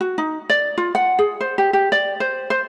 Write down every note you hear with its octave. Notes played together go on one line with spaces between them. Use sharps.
F#4
D#4
D5
F4
F#5
G#4
C5
G4
G4
D5
C5
C5